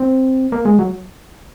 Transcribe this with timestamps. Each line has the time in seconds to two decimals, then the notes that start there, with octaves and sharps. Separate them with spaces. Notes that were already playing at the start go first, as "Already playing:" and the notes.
Already playing: C4
0.52 A#3
0.65 G#3
0.79 F#3